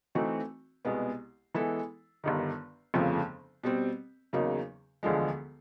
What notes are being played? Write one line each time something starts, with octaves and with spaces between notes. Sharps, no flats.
E3 A3 C4 D#4 F#4
C2 B2 G#3 B3
E3 G#3 B3 E4 A4
G1 G2 D#3
G1 F2 C#3 F3 A3
B2 G3 C4
E2 C#3 F#3 A#3 D#4
E1 D2 D3 F3 G#3